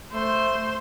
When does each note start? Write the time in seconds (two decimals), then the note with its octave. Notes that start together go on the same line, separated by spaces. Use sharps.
0.12 A3 C5